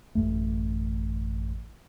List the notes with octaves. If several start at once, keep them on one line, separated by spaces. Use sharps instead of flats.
A1 F#2 A3